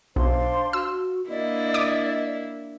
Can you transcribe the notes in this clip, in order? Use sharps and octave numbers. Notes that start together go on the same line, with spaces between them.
B1 D4 C5 F5 C6
F#4 E6
A#3 D4 E4 D5 D#5
D6 D#6